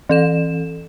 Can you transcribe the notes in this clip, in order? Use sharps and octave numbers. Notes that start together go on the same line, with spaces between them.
E3 A4 E7